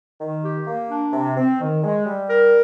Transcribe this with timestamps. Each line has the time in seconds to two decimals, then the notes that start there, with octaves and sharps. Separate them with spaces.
0.20 D#3
0.43 G4
0.67 A#3
0.90 D4
1.13 C3
1.37 C4
1.60 D#3
1.84 G#3
2.06 G3
2.30 A#4